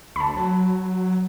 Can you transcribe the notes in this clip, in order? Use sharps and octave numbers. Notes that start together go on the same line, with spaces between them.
D2 A5 B5
F#3